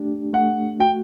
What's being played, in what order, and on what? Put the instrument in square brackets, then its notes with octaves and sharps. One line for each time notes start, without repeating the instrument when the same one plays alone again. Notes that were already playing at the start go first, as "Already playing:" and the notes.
Already playing: [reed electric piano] A3 D4 G4
[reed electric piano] A3 [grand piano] F#5
[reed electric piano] F#4 [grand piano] G5